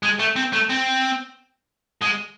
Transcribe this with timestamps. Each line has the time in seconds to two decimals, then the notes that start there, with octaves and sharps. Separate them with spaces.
0.03 G#3
0.19 A3
0.36 C4
0.53 A3
0.70 C4
2.02 G#3